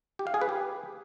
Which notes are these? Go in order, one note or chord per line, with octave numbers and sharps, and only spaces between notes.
G4
F5
G#4
B4
G4